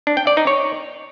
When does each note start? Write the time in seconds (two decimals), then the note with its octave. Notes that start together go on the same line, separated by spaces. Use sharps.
0.07 D4
0.17 G5
0.27 D5
0.37 D#4
0.47 C#5